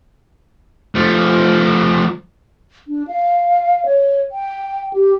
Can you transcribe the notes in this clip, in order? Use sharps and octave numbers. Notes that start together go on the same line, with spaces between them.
F3 A3
D4
F5
C#5
G5
G4